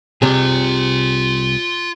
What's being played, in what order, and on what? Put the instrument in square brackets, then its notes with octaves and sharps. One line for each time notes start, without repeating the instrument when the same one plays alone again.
[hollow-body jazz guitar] C2 C3 G#4 [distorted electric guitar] F4 G#5